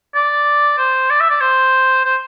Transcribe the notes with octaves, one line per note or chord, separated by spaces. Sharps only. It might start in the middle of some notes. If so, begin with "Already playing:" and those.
D5
C5
D5
E5
D5
C5
C5